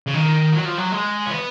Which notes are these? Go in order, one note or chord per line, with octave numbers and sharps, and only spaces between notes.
C#3
D#3
F#3
F3
F#3
G#3
C#4
B3